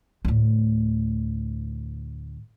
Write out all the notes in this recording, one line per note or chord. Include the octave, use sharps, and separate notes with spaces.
D2 A2